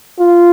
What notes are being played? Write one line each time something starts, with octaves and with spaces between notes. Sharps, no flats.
F4